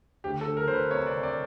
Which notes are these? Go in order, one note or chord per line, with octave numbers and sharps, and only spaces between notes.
D2 G4
A4
D2
A#4
D2 C5
B4
C3 C#5
D5
C3
D5